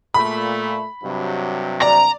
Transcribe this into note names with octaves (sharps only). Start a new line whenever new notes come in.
A#2 A3 B5
G2 C3 F#3
D5 A#5